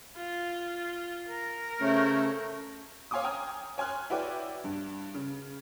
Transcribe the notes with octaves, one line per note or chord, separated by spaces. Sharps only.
F4
A#4
C#3 A3 C5 C#5
C#5 F5 G#5 C6 D6 D#6
G5 G#5 A#5 D#6 F6
C#5 G#5 C6 F6 F#6
E4 F#4 B4 C#5 D5 G5
G2
C#3